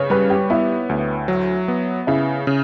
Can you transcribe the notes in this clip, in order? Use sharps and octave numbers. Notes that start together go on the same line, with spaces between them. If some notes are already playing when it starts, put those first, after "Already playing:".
Already playing: C#3 B4 C#5
G3 B4
G4
B3 E4
D2
F#3
B3
C#3 E4
C#3